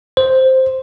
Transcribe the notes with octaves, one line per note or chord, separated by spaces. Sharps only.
C5